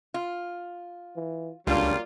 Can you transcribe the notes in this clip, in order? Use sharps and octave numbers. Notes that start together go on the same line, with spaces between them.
F4
E3
C#2 F#3 G3 A#3 D4 F4